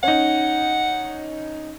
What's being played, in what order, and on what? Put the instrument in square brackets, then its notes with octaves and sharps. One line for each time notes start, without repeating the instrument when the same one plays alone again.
[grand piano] C#4 D#4 [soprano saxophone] F#5